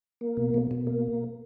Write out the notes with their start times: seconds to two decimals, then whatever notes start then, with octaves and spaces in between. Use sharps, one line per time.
0.21 A#3
0.37 B2
0.54 B2
0.71 B2
0.87 A#3